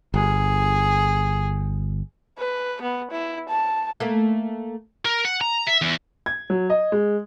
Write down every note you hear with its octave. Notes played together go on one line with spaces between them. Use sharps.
G1 G#4
B4
B3
E4
A5
A3 A#3
A#4
F#5
A#5
E5
E2
G#6
F#3
D#5
G#3